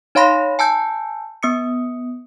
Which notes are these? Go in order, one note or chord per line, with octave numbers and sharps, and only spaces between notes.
D#4 C#5 F5 B5 C6 A#6
G#5 A5 E6 G6
B3 D#6 C#7